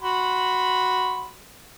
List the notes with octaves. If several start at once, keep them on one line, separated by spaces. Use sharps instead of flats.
F#4 B5 C6